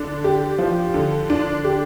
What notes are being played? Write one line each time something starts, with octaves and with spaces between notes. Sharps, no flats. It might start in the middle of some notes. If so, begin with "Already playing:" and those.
Already playing: D3 D4
G4
F3
D3
D4
G4